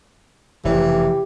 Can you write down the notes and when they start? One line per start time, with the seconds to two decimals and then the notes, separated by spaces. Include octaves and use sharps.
0.65 F1 C#3 E3 G4